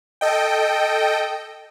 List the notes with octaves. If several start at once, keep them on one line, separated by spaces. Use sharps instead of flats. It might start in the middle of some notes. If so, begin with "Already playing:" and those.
A4 D#5 G5